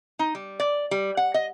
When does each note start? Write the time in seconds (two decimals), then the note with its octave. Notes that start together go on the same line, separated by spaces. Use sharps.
0.19 D#4
0.35 G3
0.60 D5
0.91 G3
1.17 F#5
1.34 D#5